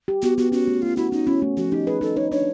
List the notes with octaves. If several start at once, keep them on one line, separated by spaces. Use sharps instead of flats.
G4
B3 F#4
B3 F#4
C#4 F#4
A3
A3 F4
E4 F#4
C#4 D#4
C#4 E4
A3
F3 F#4
D#4 G4
G#4 B4
D#4 A4
D#4 C#5
D4 C#5